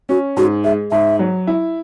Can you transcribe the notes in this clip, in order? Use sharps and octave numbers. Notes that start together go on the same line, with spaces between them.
C#4 F#4
G#2 F#4
G#3 E5
G#2 E5
F#3
E4